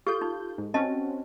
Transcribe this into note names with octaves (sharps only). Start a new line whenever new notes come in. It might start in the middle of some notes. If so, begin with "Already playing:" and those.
F4 G4 A4 G6
D#4
G#2
C4 C#4 F#4 D#5 A5